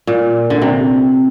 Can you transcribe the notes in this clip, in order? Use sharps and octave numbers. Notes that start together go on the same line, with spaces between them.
A#2
D3
C3